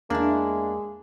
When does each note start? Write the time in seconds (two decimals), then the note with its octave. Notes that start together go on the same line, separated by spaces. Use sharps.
0.10 E2 G#3 A#3 D4 E4 A5